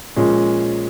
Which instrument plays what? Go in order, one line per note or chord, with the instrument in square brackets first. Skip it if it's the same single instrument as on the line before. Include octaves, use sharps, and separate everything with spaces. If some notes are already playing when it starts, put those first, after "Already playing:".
[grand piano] A#2 F3 G#3 C#4